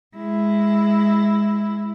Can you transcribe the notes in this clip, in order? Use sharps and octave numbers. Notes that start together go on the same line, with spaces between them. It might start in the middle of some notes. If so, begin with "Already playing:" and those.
G#3 E4